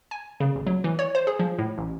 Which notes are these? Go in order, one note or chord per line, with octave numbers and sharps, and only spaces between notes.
G#5
C#3
A1
F#3
E3
C#5
C5
G#4
F3
A2
A1